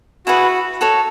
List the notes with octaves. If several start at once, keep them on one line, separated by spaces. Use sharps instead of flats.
E4 F#4 G#4 B4 F#5
F#4 A4 C#5